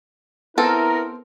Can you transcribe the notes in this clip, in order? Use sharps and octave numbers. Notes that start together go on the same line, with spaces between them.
B3 C4 E4 A4 A#4